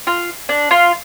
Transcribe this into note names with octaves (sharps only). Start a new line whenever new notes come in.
F4
D4
F4